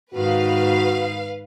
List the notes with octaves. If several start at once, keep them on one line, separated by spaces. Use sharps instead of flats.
G#2 D#3 F#4 B4 F5